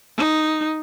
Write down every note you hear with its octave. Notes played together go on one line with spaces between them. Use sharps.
D#4